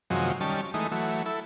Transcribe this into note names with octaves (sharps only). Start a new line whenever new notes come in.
F#2 C3 D#3 F3 F#3 G#3
D#3 G3 C#4 A5
E3 G#3 A3 D#4
E3 F#3 A3
E4 A4